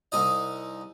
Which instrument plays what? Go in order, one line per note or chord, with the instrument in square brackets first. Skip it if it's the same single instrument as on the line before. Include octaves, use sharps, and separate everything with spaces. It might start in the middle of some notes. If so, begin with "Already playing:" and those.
[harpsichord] C2 D#4 D#5